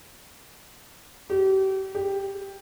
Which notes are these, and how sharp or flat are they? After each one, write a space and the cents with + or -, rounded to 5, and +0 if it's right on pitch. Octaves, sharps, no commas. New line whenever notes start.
G4 -35
G4 +5